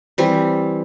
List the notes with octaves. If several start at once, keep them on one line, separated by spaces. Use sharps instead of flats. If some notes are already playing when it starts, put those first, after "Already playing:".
E3 G3 C4